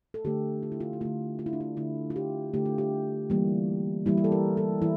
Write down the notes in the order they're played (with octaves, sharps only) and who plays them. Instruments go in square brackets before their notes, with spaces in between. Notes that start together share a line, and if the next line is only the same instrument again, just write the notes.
[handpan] A4
D3 A3 G4
F4
E4
F4
E4
D3 A3 F4
F4
E4
D4
E4
D3 A3 E4
F4
G4
D3 A3 G4
F4
G4
E3 G3 A#3 F4
E3 G3 A#3 E4
G4
A4
A#4
A4
E3 E4